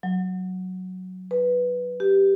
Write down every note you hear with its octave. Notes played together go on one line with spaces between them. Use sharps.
F#3
B4
G4